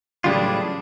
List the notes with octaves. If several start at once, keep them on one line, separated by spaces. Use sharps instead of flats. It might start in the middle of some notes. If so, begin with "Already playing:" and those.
A2 C#3 E3 F#3 G3 D4 F4 G#4